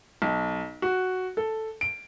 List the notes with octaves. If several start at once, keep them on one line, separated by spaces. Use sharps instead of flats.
B1
F#4
A4
D7